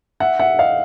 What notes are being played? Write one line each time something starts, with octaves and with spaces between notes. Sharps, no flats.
E5 F#5
E5 F#5
D#5 F5